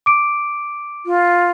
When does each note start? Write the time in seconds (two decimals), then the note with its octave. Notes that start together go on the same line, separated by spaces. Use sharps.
0.06 D6 D7
1.06 F4